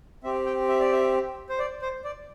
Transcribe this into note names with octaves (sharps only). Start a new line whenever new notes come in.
C4 G4 E5
G5
E5
D5
E5
C5
D5
C5
D5